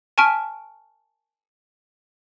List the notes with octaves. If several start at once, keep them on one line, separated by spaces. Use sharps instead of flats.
G#5 A5 C#6 F6 B6 D7